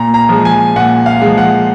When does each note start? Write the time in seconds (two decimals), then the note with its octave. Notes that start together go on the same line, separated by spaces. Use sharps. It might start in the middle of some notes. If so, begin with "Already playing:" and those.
Already playing: A#2 A#5
0.14 A#5
0.29 F3 G#3
0.45 G#5
0.76 A#2 F#5
1.06 F5
1.22 F3 G#3
1.38 F#5